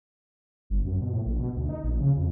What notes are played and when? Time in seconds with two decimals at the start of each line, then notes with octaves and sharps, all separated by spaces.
0.70 G1
0.85 F#2
1.01 B2
1.12 A2
1.25 A#1
1.39 B2
1.56 D2
1.69 D#4
1.83 A#1
2.00 C#3
2.16 F2